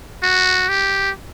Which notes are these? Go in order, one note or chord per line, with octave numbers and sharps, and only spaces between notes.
F#4
G4